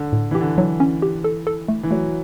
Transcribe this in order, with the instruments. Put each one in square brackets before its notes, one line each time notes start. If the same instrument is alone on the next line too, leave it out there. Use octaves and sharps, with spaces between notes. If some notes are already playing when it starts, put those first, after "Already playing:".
Already playing: [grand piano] D3
[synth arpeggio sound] A2
[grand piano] E3 [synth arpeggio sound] G4
[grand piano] D3
[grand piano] E3 [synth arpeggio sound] F#3
[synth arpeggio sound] C#4
G4
A4
A4
A3
[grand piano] E3
[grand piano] F#3 [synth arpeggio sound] A3